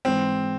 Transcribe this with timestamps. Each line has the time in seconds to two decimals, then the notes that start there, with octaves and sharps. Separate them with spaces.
0.05 G#2 E3 G#3 C4